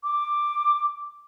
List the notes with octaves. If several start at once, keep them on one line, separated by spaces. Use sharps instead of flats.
D6